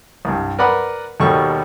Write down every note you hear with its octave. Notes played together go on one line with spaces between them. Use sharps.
C2 G2
A#4 B4 D5 F#5 B5
D#2 B2 G3 A4 C#6